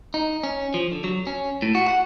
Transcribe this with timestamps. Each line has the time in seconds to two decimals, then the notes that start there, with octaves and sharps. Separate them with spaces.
0.14 D#4
0.43 C#4
0.74 F3
0.92 D3
1.04 F#3
1.27 C#4
1.62 A2
1.75 F#4
1.88 F#5